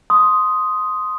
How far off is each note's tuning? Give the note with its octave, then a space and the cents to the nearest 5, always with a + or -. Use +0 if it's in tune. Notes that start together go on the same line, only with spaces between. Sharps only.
C6 +0 D#6 +5